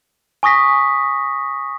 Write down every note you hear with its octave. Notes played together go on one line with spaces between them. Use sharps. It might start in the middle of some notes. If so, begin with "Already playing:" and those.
G#5 C#6 D#6 A#6 B6